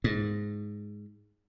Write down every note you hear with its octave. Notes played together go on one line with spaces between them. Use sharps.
G#2